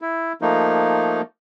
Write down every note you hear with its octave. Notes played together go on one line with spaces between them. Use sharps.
E4
F3 A3 A#3 D#4